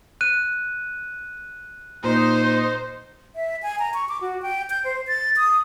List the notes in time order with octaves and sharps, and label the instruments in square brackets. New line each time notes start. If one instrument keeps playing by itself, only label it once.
[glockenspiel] F#6 D#7
[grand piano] A#2 [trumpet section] D#4 [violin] C5
[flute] E5
G#5
A#5
C#6
D6
F#4
G5
G6
C5
A6
D#6